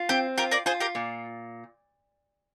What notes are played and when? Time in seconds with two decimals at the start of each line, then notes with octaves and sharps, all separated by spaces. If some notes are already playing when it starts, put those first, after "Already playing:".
Already playing: F4
0.09 C4 G4
0.38 F4 G4 A#4
0.51 A#4 D5
0.66 F4 G#4 C5
0.80 G4 A#4
0.95 A#2